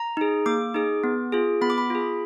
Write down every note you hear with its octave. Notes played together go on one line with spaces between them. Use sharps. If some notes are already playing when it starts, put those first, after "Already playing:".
Already playing: A#5
D#4 G#4
A#3 D6
D#4 G#4
B3
F4 G#4
B3 B5
D6
B5
F4 G#4